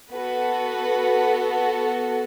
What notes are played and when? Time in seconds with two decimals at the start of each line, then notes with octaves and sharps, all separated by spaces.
0.13 B3 F#4 A4 B4